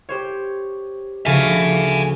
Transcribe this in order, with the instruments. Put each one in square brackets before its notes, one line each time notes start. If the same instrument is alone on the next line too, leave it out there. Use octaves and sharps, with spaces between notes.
[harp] G4 C5 C#5
[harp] D2 C#3 F3 [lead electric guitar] E5 G#5